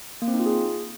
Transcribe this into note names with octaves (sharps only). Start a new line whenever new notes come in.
A#3
C4
D#4
F4
G#4